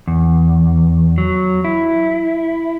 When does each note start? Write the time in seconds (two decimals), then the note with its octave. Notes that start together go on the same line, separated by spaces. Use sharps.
0.08 E2
1.18 F#3
1.64 E4